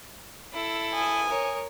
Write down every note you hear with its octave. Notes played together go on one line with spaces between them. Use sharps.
E4 A4
G#5 D#6
A#4 C#5